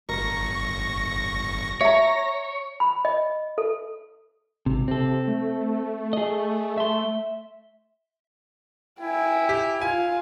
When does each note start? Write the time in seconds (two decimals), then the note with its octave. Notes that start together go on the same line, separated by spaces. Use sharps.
0.09 G1 A#4 C#6 A#6
1.81 C#5 E5 A#5
2.80 B5
3.05 D#5
3.58 A4
4.66 G#1 C3
4.88 C3 C4 A4
5.28 A3
6.13 G#4 D#5
6.78 E5 C6
9.01 E4 G5 G#5
9.49 G4
9.81 F4 G#5